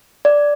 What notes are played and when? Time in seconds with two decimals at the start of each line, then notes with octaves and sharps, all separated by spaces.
0.25 D5